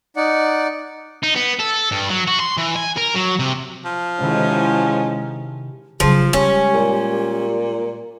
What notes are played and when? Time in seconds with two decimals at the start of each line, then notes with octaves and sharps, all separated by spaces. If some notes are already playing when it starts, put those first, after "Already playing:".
0.16 D#4 D5 F#5
1.23 D#4
1.35 B3
1.59 A4
1.92 G2
2.09 F#3
2.27 F#4
2.40 C6
2.57 E3
2.76 G#5
2.98 A#4
3.16 F#3
3.39 C3
3.85 F3
4.20 G#2 C3 D#3 G#3 C#4 E4
6.00 C#3 F3 F#3 G#4
6.33 G3 G#3 C#4 G4
6.74 A#2